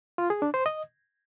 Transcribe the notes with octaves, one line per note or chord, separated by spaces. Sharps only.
F4
G#4
D4
C5
D#5